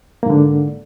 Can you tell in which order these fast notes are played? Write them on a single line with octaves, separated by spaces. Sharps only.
A#3 G#2 D3